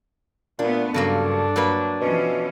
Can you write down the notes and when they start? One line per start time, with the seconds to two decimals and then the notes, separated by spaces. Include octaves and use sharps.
0.59 A#2 A3 B3 D4
0.94 G2 C#3 F#3 A#3 D4 A4
1.56 F#3 A#3 B4
2.01 B2 E3 F3 C#4